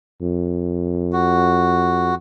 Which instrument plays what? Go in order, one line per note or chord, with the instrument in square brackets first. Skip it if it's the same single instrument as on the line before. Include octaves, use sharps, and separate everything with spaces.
[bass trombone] F2
[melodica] F#4